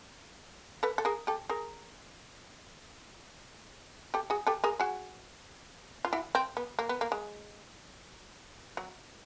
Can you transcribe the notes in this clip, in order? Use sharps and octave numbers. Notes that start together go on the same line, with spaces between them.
A4 B4
A4
G#4 A#4
G4 A4
G#4 A#4
G4 A4
F#4 G#4
G4 A4
G#4 A#4
F#4 G#4
F4
E4 F#4
C4
B3
A#3
B3
A#3
G#3
F#3